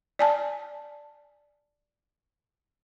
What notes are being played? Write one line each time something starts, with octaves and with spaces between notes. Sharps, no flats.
D5 G#5 A5